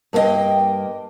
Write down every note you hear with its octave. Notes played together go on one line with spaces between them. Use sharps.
G2 A#3 A#4 D#5 G5